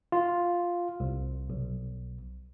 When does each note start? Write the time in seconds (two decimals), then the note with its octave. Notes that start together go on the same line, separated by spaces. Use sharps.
0.12 F4
1.00 C2
1.50 B1